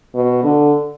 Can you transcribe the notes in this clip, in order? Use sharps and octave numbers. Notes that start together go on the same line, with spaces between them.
B2
D3